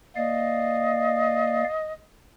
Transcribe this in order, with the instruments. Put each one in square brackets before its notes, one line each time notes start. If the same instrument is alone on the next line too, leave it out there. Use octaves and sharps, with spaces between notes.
[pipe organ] A#3 D5 F5 [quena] D#5